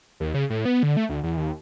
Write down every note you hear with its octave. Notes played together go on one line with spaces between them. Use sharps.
D#2
C#3
A2
B3
D3
A3
D2
E2
D#2